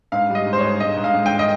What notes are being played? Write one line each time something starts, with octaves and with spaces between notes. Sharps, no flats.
G#2 F5
G3 D#5
G#2
C5
G#2 C#5
G#2 D#5
G#2
F5
G#2
G5
D#5